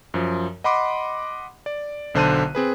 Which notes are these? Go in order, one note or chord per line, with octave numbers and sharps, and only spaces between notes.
F#2 F3
D#5 F#5 B5 C6 D6
D5
B1 D3 C5 A5 F#6 D#7
C4 G#4 B4